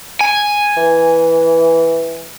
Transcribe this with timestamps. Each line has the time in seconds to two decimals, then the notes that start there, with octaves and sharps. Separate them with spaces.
0.21 G#5
0.77 E3